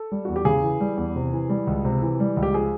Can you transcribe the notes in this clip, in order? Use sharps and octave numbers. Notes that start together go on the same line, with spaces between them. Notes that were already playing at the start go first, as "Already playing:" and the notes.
Already playing: A4
G3
E2 F#4
G4
C#3 G#4
E3
G3
E2
C3
E3
G3
C#2
C3
E3
G3
C#2
G4
F3 G#4